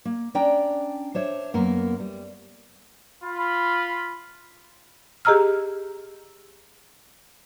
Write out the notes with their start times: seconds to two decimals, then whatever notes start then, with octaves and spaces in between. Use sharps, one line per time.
0.05 A#3
0.35 C#4 D4 D5 G5 A#5
1.15 D4 C5 C#5 E5
1.54 F#2 A#3 B3 A#4
2.00 G3
3.24 F4 B5
5.25 G4 G#4 D#5 A#5 E6 F6